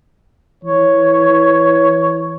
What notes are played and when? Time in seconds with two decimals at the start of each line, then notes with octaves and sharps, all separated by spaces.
0.64 E3 C#5